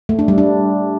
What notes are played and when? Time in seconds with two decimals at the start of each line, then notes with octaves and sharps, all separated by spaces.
0.09 A3
0.19 D4
0.28 G3
0.38 D4